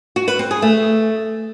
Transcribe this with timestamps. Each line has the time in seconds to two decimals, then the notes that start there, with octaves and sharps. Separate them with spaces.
0.16 F#4
0.28 B4
0.39 C4
0.51 G#4
0.62 A3